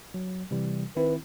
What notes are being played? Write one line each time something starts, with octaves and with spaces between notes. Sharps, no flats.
F#3
C3 E3 G3
D#3 C4 E4 B4